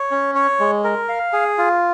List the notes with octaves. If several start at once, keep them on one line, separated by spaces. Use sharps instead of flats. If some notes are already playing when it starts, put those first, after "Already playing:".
Already playing: C#5
C#4
C#5
G#3
A#4
F5
G#4
F4